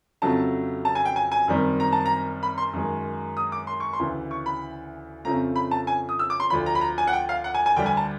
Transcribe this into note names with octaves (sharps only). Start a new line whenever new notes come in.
F2 C#3 F#3 A3 A5
A5
G#5
G5
G#5
G#5
F#2 D#3 G3 C4
A#5
A5
A#5
B5
C6
F#2 D#3 G#3
D#6
D6
C6
C#6
C6
D2 C#3 E3
C#6
B5
F2 C#3 F3 A3 A#5
B5
A5
G#5
D#6
E6
D6
C6
D2 D3 F3 B5
A#5
B5
A#5
G#5
F#5
G5
F5
F#5
G#5
G#5
D2 D3 G3 G5
G#5
A5